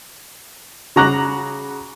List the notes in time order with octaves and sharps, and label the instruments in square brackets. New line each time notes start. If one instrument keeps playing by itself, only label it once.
[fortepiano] C#3 F#4 A#5 D6 F#6